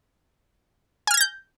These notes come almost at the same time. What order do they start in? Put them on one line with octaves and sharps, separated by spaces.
G#5 F6 G#6 A#6 G6